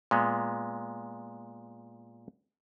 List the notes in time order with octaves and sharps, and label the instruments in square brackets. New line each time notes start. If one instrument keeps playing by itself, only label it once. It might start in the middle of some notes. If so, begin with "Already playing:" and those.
[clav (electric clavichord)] A#2 G#3 B3